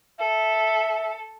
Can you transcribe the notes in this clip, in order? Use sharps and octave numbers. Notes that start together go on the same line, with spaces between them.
A4 E5